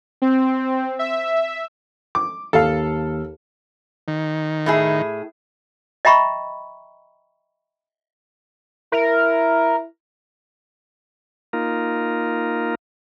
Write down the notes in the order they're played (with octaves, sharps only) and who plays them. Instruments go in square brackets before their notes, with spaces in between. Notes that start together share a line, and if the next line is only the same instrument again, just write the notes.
[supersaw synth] C4
E5
[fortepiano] D6
[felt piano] D#2 [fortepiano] A4 F5
[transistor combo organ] D#3
[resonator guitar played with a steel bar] A2 E4 G#4
[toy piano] D#5 E5 G5 A#5 B5 C#6
[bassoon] E4 [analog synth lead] A#4
[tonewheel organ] A#3 D#4 F4 A#4